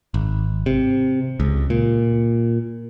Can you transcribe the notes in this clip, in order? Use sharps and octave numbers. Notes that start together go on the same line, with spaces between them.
G#1
C3
C#2
A#2